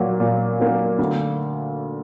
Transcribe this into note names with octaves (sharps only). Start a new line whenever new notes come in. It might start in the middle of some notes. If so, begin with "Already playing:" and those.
Already playing: A#2 F#3 A#3
A#2
F#3 A#3
D2